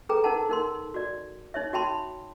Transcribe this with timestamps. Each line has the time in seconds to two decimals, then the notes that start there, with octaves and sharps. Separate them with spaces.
0.09 G#4 A4 B4 G5 A#5
0.24 D#4 A#4 F#5 A5
0.49 D#4 A#4 C6
0.94 F#4 D5
1.54 D#4 C#5 E5
1.73 F#4 E5 G5 A5 B5 C6